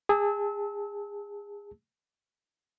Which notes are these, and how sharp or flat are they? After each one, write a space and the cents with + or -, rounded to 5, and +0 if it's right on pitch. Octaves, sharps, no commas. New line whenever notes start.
G#4 -25 A5 +0 E6 -30